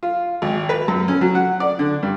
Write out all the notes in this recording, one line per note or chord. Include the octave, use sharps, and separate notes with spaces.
F4
G#1
B4
F#2
C#4
F#3
F#5
D5
D3
G2